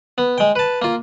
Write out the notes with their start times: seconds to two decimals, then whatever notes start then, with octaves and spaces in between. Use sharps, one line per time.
0.18 B3
0.38 G#3 G5
0.56 B4 A5
0.82 A#3 F4